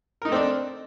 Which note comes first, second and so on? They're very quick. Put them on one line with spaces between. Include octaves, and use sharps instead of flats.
A#4 D#4 A3 C4 D4